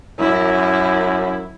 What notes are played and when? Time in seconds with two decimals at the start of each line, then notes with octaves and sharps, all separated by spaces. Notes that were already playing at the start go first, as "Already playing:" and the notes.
0.19 F#2 E4